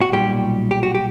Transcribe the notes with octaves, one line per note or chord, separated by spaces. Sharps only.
F#4
B1 A#2 G3 G4
G4
F#4
G4